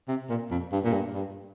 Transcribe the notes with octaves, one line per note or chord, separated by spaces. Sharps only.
C3
A#2
F2
G2
A#2
G2
G2